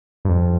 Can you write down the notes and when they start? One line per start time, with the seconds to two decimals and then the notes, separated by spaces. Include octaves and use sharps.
0.25 G2
0.29 F2